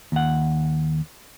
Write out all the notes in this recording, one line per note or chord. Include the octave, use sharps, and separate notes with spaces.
D#2 F#5